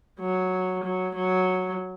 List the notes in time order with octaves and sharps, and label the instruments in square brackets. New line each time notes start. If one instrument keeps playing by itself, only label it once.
[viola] F#3
F#3
F#3